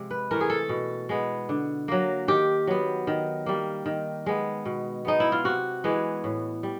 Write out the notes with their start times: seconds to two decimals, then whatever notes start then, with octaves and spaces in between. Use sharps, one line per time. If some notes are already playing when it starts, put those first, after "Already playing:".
Already playing: C3 F3 G#3
0.11 B4
0.31 E3 A3 A#4
0.41 G#4
0.50 A4
0.69 B2
1.09 G#3 B3
1.49 D3
1.88 F#3 A#3
2.28 D#3 G4
2.67 F#3 B3
3.07 D#3
3.46 G3 A#3
3.86 D#3
4.26 G#3 B3
4.65 B2
5.05 G#3 B3 D#4
5.20 E4
5.32 F4
5.44 C3 F#4
5.84 E3 G#3 B3
6.24 A2
6.63 G3